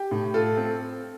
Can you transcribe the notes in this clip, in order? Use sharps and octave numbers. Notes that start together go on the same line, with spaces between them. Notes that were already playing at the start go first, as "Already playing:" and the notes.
Already playing: G4
A2
F4 A4
C4